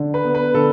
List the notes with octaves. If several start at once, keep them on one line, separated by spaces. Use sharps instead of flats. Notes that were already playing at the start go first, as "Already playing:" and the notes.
Already playing: D3
B4
B3
B4
D3 A4